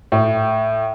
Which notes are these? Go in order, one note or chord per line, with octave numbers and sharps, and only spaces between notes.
A2